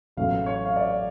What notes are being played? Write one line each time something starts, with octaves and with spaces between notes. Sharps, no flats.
A1 A2 F#3 A3 F5
C#5
F5
D5